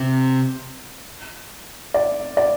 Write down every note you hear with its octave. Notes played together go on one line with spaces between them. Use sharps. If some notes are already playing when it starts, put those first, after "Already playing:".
Already playing: C3
D5
D5